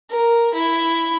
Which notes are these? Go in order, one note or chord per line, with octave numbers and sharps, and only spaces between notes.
A#4
E4